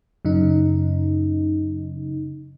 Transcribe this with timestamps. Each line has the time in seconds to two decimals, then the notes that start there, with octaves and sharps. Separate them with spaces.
0.25 F#2 C#3 D#4